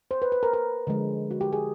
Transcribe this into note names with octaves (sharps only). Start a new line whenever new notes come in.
C5
B4
B4
A#4
A#4
D3 F3 G#3
F#4
G4
G#4